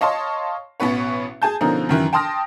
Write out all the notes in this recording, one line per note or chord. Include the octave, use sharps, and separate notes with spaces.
C#5 D#5 F5 A5 C6
A1 B2 B3 C#4 B4 C#5
G#4 G#5 A5 G6
B2 D3 F3 C#4 D#4 A#4
F#2 D#3 E3
G5 A5 C6 D#6 F6 A#6